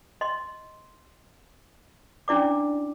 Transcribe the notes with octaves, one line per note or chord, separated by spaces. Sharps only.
D#5 C6
C#4 D4 E4 D5 D6